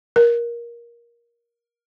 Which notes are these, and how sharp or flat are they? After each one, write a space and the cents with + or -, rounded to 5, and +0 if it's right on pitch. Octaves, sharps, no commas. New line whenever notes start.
A#4 +15